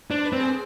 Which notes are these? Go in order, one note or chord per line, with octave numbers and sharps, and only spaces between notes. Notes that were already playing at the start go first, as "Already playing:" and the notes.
D4 C5
B4
C4
G#4